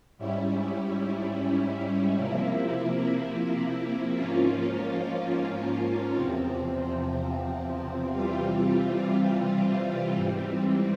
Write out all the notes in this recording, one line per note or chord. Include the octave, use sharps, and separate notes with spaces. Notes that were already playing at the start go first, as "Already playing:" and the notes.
G#2 G3 C#4 E4
C3 F3 A#3 E4
G#2 F3 A#3 C#4 F4
E2 C3 F3 C4
C3 E3 G3 C4 F4
G#2 E3 G3 C4